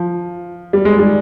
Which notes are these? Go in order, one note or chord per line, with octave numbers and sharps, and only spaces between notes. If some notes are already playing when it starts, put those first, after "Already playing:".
Already playing: F3
G3
G#3
G3